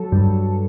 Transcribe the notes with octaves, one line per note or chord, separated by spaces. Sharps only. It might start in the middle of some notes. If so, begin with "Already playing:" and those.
Already playing: F#3 A4
G2